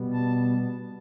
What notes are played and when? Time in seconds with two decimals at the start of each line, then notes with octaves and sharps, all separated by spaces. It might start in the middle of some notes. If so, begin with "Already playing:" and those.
Already playing: B2 G3 B3
0.12 A5